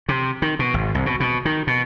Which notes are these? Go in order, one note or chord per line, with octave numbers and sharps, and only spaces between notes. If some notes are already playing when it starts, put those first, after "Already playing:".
C3
D#3
B2
G#1
C2
B2
B2
D#3
B2